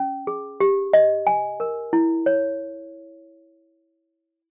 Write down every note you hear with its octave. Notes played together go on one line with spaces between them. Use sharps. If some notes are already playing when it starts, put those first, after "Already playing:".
Already playing: C#4
G#4
G4
D#5
G#5
A#4
E4
C#5